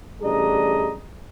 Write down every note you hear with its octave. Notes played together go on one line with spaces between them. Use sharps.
A1 G3 D4 G#4 D#5 A#5